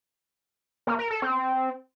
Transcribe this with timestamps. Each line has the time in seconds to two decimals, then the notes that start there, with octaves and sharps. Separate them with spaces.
0.87 A#3
0.99 A#4
1.10 A4
1.22 C4